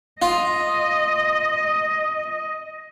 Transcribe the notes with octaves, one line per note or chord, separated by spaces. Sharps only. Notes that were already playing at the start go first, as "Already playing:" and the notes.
F4 D#5